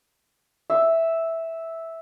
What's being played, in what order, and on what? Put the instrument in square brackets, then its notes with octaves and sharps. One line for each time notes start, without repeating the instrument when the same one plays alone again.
[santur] E5